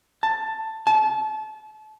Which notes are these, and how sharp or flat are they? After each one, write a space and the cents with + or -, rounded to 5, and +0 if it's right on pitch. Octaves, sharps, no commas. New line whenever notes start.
A5 +10
A5 -30